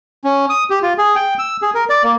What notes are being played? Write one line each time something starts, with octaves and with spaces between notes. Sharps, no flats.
C#4
D#6
G4
F4
G#4
G5
E6
G#4
A#4
D5
A#3